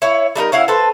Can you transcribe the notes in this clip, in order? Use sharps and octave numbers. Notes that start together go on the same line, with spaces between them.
E4 C#5
G3 A3 D#4 A#4
C#4 E4 F5 F#5
A4 B4 C5